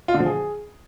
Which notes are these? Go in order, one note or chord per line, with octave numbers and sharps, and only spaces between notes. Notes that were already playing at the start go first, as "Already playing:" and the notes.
F4
D3
F3
G#4